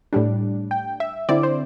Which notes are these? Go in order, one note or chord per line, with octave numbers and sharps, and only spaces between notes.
A2 G3 D4
G5
E5
D3 C4 E4 D5
C5